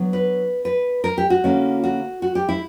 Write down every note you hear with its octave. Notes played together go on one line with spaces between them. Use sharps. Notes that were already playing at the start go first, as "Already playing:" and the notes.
Already playing: F#3 B3 D4
B4
B4
A#4
G4
F#4
D3 A#3 C#4 E4
F#4
F#4
G4
E4